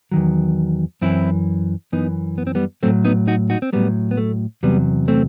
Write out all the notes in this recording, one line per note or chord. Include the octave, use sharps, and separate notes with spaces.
E2 D#3 F#3
F#2 E3 C4 E4
F#2 E3 B3 D#4
B3
C4
G3 B3
A2 F#3 A3 C4
B3 D#4
D#4 F#4
D#4 F#4
C4
A2 F#3 G3 B3
B3
A3
E2 C3 F#3 G3 B3
A3 C4